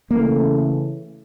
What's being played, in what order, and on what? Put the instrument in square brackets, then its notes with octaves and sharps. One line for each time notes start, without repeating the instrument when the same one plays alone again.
[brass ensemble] C#3 E3 A3 [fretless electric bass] A#3